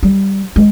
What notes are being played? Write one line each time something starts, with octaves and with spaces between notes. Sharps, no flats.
G3
G#3